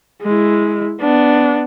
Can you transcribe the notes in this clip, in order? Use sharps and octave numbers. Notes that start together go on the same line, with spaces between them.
G#3 E4
B3 D4